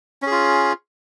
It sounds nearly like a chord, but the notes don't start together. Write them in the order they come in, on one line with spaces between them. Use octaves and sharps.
C#4 G#4 F4